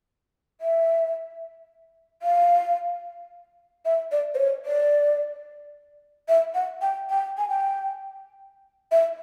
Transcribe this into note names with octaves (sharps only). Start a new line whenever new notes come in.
E5
F5
E5
D5
C5
C#5
D5
E5
F#5
G5
G5
G#5
G5
E5